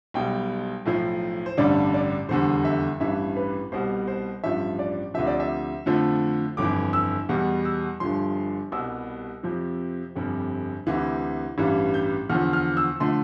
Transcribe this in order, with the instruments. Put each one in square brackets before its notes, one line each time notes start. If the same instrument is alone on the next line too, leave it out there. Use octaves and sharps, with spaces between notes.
[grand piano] B1 B2 G3 G5
B1 A2 F3
C5
A1 G2 D3 G3 D5
D5
F1 E2 D3 G3 C5
E5
A1 G2 E3 E5
B4
C2 B2 G3 C5
C5
A1 G2 F3 E5
D5
D2 C3 F3 E5
D5
E5
F2 D3 F3 A3
G1 F2 E3 D6
E6
E2 B2 G3
E6
G1 G2 F3 C6
C2 B2 G3 E6
F2 C3 F3
G1 F2 C3 G3
D2 C3 E3
A1 G2 E3 G3
G6
E2 D3 F3 F6
F6
E6
D3 F3 A3 C6